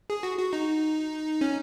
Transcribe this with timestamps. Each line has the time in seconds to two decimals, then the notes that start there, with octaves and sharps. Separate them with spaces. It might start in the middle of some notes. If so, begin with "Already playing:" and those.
0.10 G#4
0.23 F#4
0.39 F#4
0.53 D#4
1.41 C#4